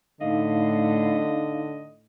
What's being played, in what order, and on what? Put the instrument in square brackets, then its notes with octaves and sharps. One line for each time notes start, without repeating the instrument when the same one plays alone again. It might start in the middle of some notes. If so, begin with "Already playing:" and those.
[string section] A2 [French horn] D3 [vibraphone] D#4 F5 [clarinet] D#5